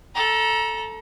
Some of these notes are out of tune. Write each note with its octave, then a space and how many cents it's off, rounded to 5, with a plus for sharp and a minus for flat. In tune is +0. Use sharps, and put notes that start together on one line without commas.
A4 +0 A#5 +30